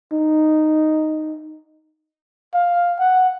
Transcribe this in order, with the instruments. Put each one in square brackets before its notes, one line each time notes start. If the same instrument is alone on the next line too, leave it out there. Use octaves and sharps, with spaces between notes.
[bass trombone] D#4
[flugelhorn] F5
F#5